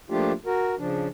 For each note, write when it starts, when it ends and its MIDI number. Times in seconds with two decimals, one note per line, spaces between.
0.10 0.32 53
0.10 0.32 57
0.10 0.32 58
0.10 0.32 62
0.10 0.32 65
0.10 0.32 67
0.46 0.75 66
0.46 0.75 70
0.79 1.08 49
0.79 1.08 53
0.79 1.08 62